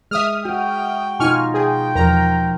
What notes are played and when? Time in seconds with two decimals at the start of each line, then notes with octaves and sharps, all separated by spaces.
0.11 G#3 E5 D#6 F6
0.45 F#4 G5
1.20 B2 D#4 F4 G#5 C#6 F6
1.54 G#4 G5
1.95 E2 F3 A#4 A#5